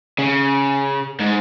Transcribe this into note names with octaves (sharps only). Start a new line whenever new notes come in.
C#3
G#2